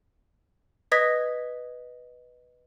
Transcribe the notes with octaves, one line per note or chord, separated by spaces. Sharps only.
B4 D#5 D#6 G#6 A#6 B6